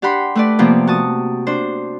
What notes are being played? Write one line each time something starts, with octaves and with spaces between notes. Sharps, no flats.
D4 G4 F#5 B5 C6
A3 B4 D5
C3 F3 A#3 B3
F#4 A5 D#6
D4 C5